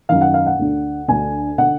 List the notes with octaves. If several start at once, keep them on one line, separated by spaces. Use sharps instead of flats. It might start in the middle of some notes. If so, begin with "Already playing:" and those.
F#2 D#3 F5
F#5
F5
F#5
D2 D3
D2 D3 G#5
D3 F#5